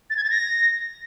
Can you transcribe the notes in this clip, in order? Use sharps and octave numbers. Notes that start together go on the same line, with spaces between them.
A6
G#6
A6
A#6